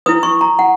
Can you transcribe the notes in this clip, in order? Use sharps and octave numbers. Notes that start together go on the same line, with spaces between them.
E4 B4 D#6
C#6
A#5
F#5